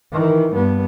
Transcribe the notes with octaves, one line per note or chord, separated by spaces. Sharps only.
D#3 E3
G2 B3